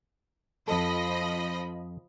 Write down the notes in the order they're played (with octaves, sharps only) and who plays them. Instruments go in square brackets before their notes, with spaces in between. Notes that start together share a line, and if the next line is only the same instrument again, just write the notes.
[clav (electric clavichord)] F2 A4 [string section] F3 D#5 B5